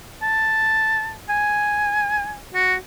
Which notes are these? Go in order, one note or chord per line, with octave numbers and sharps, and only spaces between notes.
A5
G#5
F#4